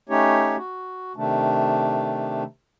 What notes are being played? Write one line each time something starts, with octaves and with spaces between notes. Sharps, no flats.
A3 C#4 D#4 G4 C#5
F#4
C3 D#3 A3 D4